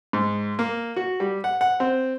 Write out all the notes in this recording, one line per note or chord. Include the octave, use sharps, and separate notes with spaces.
G#2
A#3
F#4
G3
F#5
F#5
C4